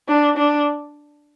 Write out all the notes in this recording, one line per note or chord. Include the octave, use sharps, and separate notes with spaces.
D4
D4